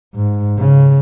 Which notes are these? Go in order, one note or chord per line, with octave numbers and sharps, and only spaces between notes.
G#2
C#3